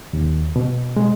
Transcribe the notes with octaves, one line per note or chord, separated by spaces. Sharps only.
D#2
B2
G#3